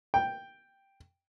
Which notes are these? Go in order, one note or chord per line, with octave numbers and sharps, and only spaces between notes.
G5